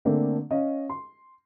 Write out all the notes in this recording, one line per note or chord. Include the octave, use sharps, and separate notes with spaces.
D3 A3 A#3 C4 D4
C#4 D#5 F5
C6